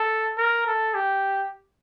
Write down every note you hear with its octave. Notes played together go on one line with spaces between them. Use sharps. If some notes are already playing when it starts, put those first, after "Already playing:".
Already playing: A4
A#4
A4
G4